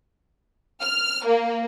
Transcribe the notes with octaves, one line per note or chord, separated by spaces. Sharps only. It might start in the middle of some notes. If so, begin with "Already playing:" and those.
F6
A#3